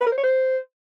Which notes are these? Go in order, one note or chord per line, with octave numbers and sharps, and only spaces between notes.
B4
A#4
C5
C#5
C5